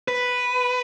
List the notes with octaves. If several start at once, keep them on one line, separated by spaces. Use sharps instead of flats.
B4